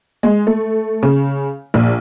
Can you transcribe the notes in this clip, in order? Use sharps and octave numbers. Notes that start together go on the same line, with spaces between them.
G#3
A3
C#3
A#1